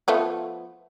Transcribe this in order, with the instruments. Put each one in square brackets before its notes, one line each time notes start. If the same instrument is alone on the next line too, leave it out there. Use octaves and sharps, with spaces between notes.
[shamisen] F3 A3 B3